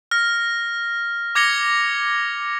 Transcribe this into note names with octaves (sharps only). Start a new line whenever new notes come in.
F6 A#6
D6 G#6 A#6 C#7 F7 G7